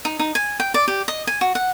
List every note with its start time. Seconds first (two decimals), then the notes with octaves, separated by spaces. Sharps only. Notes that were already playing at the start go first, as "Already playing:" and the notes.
0.05 D#4
0.19 D#4
0.35 G#5
0.60 G5
0.74 D5
0.88 G4
1.08 D#5
1.27 G#5
1.41 F#4
1.55 F#5